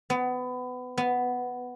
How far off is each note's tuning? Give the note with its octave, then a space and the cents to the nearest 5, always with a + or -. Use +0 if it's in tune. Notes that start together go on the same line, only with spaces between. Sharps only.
B3 +25
B3 +5